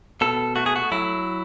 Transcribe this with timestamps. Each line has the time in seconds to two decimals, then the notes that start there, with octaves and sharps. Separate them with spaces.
0.21 B2 A4
0.56 A3 F#4
0.66 G#4
0.76 F#4
0.92 F#3 E4